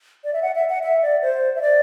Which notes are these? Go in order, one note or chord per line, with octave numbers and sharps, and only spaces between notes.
D5
E5
F#5
E5
F#5
E5
D5
C5
E5
D5